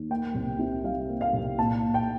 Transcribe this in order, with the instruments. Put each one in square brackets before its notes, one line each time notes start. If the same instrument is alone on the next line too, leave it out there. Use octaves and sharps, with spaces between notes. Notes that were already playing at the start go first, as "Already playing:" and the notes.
Already playing: [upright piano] D#2
A#3 G5
C2
C3
G3 F5
A#3
F5
C2
A#2 A5
A#2
G5